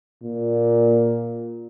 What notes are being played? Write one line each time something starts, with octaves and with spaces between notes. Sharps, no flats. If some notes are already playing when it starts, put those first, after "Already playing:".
A#2